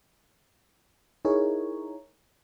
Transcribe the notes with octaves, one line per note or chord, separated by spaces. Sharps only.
D#4 E4 G#4 A#4 C#5